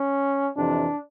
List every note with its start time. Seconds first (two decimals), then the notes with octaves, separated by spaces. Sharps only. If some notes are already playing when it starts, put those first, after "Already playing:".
Already playing: C#4
0.56 F2 C3 E3 D4